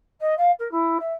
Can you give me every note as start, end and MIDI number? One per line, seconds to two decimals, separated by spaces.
0.20 0.34 75
0.37 0.51 77
0.59 0.70 70
0.71 0.97 64
1.00 1.13 76